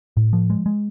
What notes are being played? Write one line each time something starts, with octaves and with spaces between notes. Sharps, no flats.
A2
F3
G#3
G#3